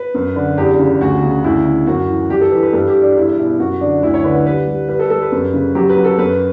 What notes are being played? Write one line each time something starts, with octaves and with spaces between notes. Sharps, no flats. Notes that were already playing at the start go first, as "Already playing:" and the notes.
Already playing: B4
F#2
D3
E2 G4
C#3
D2 F#4
C#3
D2 E4
C#3
F#2 F#4
E3
G2 G4
A4
E3 B4
B4
G2 A4
G4
E3
D4
E2 E4
B2 E4
F#2 F#4
D3 D4
D2 E4
C#5
D3 B4
B4
G3 B4
G3
G3 B4
A4
G3 A4
B4
F#2
C#3
F#3 G4
B4
F#3
A4
F#2 B4